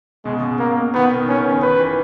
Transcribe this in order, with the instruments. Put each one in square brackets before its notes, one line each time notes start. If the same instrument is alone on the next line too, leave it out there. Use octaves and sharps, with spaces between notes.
[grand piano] B2 [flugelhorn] G#3
[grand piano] C#3
B2
[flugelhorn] A#3
[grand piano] D#3 [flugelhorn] B3
[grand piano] B2
[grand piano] D#3 [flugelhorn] C#4
[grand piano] C#3
D#3
[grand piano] D#3 [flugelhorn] B4
[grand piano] E3